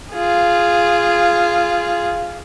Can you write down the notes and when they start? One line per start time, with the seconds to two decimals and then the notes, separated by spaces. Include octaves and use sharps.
0.13 F4 G#4